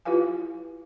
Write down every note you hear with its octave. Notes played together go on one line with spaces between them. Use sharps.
E4 F4 G4 B4 F5 G#5